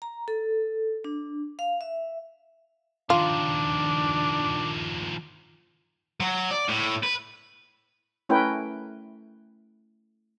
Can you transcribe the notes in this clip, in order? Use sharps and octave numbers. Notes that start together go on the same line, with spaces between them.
A#5
A4
D4
F5
E5
D#3 F3 D4 F4
F#3
D5
A2
B4
A3 C#4 E4 A#4 B4 G5